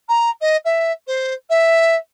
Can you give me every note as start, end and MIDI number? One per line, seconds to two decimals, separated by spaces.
0.08 0.30 82
0.41 0.56 75
0.65 0.92 76
1.07 1.33 72
1.49 1.96 76